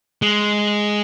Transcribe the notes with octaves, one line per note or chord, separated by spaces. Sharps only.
G#3